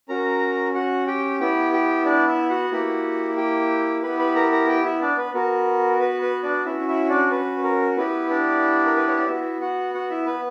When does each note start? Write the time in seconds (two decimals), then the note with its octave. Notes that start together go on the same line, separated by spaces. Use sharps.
0.09 C#4 F#4 A#4 A#5
0.74 F#4 F#5
1.07 G4 G5
1.40 B3 E4 G4 G5
1.73 G4 G5
2.05 D4 D5
2.28 E4 E5
2.50 F#4 F#5
2.72 A#3 E4 G4
3.37 G4 G5
4.02 B3 E4 G4 B4 B5
4.19 B4 B5
4.35 A#4 A#5
4.52 A#4 A#5
4.68 G4 G5
4.84 E4 E5
5.02 D4 D5
5.18 B4
5.35 B3 F#4 A#4
6.00 B4
6.22 B4
6.43 D4 D5
6.65 C#4 E4 F#4 E5
6.88 E4 E5
7.09 D4 D5
7.31 B4
7.63 A#4
7.97 B3 E4 G4 B4
8.30 D4 D5
8.85 A#4
8.96 B4
9.07 C#5
9.17 D5
9.28 B3 E4 F#4 E5
9.61 F#4 F#5
9.94 F#4 F#5
10.10 E4 E5
10.26 B4